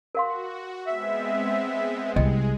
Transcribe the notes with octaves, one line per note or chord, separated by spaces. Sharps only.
F#4 A#4 F5 C6
G#3 B3 C4 E5
C2 G#3 G#4 D#5 G5